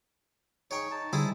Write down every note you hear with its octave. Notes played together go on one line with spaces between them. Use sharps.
D#4 G#4 C#5 G5 C#6
D#4 A5
D3 G3 C4 E4 G#4